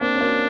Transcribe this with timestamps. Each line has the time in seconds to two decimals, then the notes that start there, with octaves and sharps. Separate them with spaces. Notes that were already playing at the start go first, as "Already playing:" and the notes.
0.01 A#3 C4 D4
0.15 C#4
0.20 A#3 C4